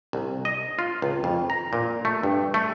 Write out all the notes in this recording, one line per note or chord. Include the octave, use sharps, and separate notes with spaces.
C2
D#5
F4
C#2
F2
A#5
A#2
A3
G2
A3